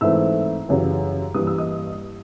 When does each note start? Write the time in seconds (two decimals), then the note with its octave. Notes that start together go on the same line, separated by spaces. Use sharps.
0.01 G#2 E3 A3 C4 E4 E5 E6
0.68 F#2 C#3 E3 G3
1.34 G2 E3 G3 A#3 D#6
1.47 E6
1.58 D#5 D#6